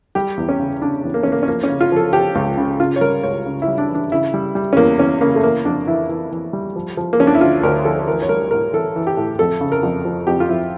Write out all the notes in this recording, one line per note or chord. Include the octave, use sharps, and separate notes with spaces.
G3 G4
E2
C#4
C#3
C#3 D4
E2
A#3
E2 C#4
A#3
C#4
F3 A#3
C#4
C#3
F4
F3 A4
F3 G4
C#2
C#3
C#3 F4
C#5
G3 A#4
C#2 C#5
C#3
E4
G3
D4
E3 D4
C#3 E4
G3
G3
C#4
E2 A#3
E2 C#4
C#3 A#3
A3
E3 A#3
F2 D4
E3 E4
E3
E3
G3
F3
F3
A#3
F3 C#4
D4
E4
D2 F4
D2 A#4
F3 A4
E3 A#4
C#5
G3 A#4
A2 A#4
E3 A4
E3
G4
A2
F2 A4
C#3
A#4
F2
F3
F2 G4
F4
F2 E4